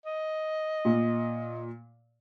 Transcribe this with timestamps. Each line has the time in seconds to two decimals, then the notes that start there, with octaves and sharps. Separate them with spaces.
0.06 D#5
0.85 A#2